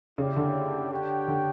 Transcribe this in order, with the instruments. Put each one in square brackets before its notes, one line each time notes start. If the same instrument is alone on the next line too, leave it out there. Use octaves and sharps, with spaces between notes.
[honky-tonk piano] C#3 [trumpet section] E4 G4 D5 G5
[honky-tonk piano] D3
[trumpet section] D4 G4 C#5 G5
[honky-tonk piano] D3